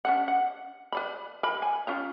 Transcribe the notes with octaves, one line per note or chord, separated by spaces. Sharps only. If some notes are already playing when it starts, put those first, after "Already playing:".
C#4 D4 F#5
F#5
B4 D5 B5
A#4 B5
G#5
C#4 F4 A#5